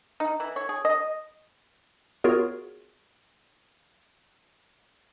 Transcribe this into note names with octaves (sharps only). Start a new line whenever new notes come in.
D#4
E3
C#5
G#4
D#5
B3 F4 F#4 G#4 A#4 C#5